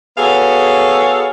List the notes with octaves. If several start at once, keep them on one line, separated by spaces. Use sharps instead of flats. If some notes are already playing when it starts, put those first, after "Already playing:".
B3 F#4 G#4 A4 C#5 F5